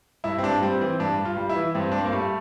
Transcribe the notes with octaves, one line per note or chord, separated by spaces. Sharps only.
G2 E4
C4
G2 D4
G3 C4
E3 C4
G2 D4
G2
F4
G3
E4
E3
G2 C4
D4
G2 C4
A#3
G3 A3